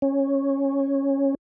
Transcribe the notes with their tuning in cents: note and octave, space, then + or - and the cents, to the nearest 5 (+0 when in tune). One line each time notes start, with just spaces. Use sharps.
C#4 -10